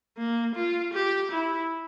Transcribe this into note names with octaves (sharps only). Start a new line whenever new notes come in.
A#3
F4
G4
E4